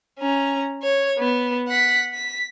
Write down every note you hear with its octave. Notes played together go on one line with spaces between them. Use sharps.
C#4 A#5
C#5
B3
F#5 B6
B6